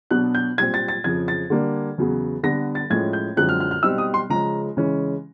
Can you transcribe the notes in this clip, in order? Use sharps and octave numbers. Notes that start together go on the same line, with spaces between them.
B2 F#3 B3 D4 F#6
G6
A#2 G3 C4 G#6
A6
A6
F2 C#3 F3 G#6
A6
D3 G3 A#3 D4
E2 C#3 F#3 B3
D3 G3 B3 D4 A#6
A6
A2 F3 G#3 C#4 G#6
G6
F#2 D3 F3 G#3 C4 F#6
F6
F6
F6
B2 G3 C4 D#4 E6
D#6
C6
C#3 F3 G#3 C#4 A#5
C#3 E3 G#3 C#4